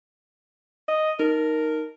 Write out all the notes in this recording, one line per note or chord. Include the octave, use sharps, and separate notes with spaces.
D#5
D#4 A#4